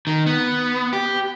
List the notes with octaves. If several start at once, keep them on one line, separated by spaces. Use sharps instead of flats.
D#3
B3
G4